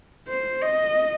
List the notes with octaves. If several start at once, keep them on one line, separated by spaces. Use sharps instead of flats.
C5
D#5